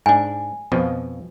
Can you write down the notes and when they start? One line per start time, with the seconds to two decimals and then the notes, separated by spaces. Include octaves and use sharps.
0.06 G#2 D4 G#5
0.72 F2 B2 F3